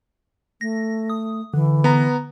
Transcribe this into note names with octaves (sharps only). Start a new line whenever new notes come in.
A3 A#6
D#6
D3 E3
B3 A#5